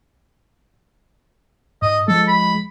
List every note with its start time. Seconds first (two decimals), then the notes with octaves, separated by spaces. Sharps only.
1.82 G#2 D#5
2.08 F3 G#3 A4
2.27 B5